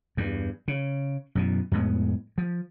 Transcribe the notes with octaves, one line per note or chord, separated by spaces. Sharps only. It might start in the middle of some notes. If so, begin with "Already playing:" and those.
E2 G2
C#3
F#2 B2 E3
F2 A2 G#3 B3
F3